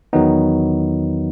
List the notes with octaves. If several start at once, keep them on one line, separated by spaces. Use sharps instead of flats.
E2 D#3 F#3 B3 D#4